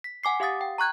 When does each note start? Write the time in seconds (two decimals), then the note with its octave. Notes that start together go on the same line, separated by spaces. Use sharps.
0.04 B6
0.24 F#5 G#5 D6 C7
0.40 G4 F5 F#5 D#6 A6
0.61 G5
0.78 A#5 C#6 F#6 G#6